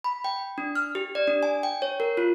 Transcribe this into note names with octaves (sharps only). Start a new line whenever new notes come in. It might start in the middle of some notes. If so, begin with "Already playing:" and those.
B5
G5
D4
F6
G4
D5
D4
G#5
G5
C#5
A#4
F4